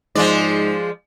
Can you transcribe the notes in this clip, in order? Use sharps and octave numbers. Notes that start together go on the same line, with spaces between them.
G#2 F3 G#3 D5